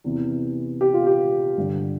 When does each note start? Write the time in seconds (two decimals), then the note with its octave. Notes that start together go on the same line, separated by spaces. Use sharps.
0.04 E2 C3 E3
0.81 G4
0.94 F4
1.07 G4
1.58 G2 D3